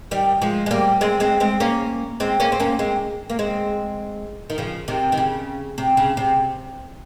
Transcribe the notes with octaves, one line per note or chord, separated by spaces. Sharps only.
D#3 G3
F3 G#3
G#3
G3 A#3
G#3 C4
G#3 C4
G#3 C4
A#3 C#4
G#3 C4
A#3 C#4
C4
A#3 C#4
G#3 C4
A#3
G#3 C4
D#3
C#3 F3
C3 D#3
D#3
C#3
C3
C#3
C3